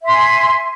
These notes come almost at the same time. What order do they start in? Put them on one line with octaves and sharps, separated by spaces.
E5 C6 G#5